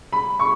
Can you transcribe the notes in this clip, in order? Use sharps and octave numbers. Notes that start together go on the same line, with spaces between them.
B5
C#6